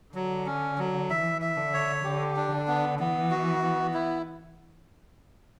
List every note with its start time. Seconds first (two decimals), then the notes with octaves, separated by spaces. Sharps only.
0.15 D3 F#3
0.46 C#4
0.78 F#3
1.10 E3 E5
1.42 E5
1.57 D3
1.73 C#5
2.04 D3 G4
2.36 D4
2.52 D3
2.68 B3
2.99 E3 B3
3.31 F#4
3.62 B3
3.94 E4